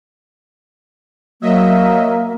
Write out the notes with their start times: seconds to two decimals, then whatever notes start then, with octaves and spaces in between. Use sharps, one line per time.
1.41 F#3 A#3 D#5 E5